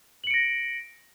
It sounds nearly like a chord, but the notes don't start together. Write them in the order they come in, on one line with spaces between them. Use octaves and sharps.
F#7 C#7 D7 A#6